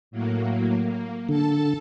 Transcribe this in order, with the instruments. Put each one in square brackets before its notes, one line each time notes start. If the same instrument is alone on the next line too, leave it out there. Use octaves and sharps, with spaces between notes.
[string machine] A2 F#3 A#3
A#3
[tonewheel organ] D3 [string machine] A4 A5